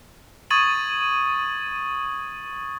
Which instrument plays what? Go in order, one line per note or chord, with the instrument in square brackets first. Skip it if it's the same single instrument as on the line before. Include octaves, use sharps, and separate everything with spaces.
[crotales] C#6 D#6 G#6 A6 D#7 F#7